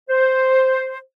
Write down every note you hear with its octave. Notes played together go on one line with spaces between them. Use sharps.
C5